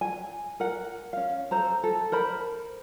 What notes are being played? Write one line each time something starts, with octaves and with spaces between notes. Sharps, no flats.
G#5
A#4 F#5
C#4 F5
A4 C5 A#5
A4
A#4 C5 B5